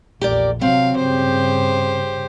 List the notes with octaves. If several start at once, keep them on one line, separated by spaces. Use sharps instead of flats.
A#1 E2 G4 A#4 D5
C3 F#3 C4 F5
G2 C#3 G4 C5